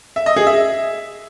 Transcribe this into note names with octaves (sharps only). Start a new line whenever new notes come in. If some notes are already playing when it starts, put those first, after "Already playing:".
E5
D#5
G#4
E5